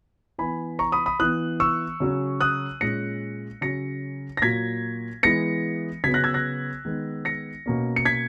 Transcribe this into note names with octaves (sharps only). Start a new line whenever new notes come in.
E3 B3 G#5 B5
A#5 C#6
B5 D#6
B5 D#6
E3 B3 D#6 F#6
C#6 E6
C#3 F#3 C#4
D#6 F#6
A#2 G#3 C#4 A#6 C#7
C#3 F#3 C#4 A#6 C#7
A#6
A#2 F#3 A#3 G#6 B6
E3 G#3 B3 A#6 C#7
C#3 F#3 B3 G#6 B6
F#6 A#6
E6 G#6
F#6 A#6
D#3 G#3 B3
A#6 C#7
B2 A#3 C#4
C#7
G#6 B6